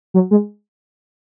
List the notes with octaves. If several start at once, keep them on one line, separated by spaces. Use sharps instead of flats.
F#3
G#3